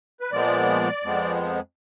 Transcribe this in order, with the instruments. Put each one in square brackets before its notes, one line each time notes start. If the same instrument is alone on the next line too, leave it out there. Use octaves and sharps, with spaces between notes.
[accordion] B4
A#2 F3 G#3 B3 D5
F2 F3 G#3 B3